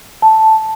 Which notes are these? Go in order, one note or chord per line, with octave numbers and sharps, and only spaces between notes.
A5